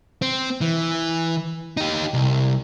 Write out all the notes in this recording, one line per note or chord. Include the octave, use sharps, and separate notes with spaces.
C4
E3
D#4 G4
C2